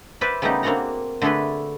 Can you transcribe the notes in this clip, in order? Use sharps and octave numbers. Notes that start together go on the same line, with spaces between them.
B4 C5 D5 E5
C#3 G3 A3 B3 D#4 G4
A#3 C4 D4 F#4 F#5 A#5
D3 A3 D4 G#4 A4 B4